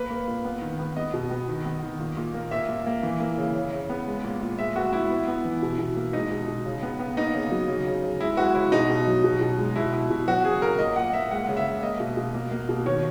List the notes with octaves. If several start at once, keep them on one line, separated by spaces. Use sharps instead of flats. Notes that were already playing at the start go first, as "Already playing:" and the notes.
Already playing: A#3 B4
A#3
A#2
B3
D#3
B3
B3 D#5
B2
B3
D#3
B3
D#3
A#2
A#2
A#3
A#2 E5
A#2
A#3
E3
A#3
C#3
C#3
C#3
B3
G#3
A#2
A#2
G#3 E5
B3 F#4
B3 E4
B3
B3
E3
B2
B2
A#3
G#3 D#4
B2
B2
C#3
B3
B3
A#3 D#4
C#3
F#3
C#3
C#3
C#3
G#3 E4
G#3 F#4
C#3 E4
B2 D#4
B2
F#3
B2
B2
G#3
B2 E4
B2
B2
F#3 F#4
C#3 G#4
C#3 A#4
A#2 D#5
A#2 F#5
A#3 E5
G#3 F#5
C#3
E5
G#3
A#3 D#5
B2
B2
A#3
A#3
B2
D#3 C#5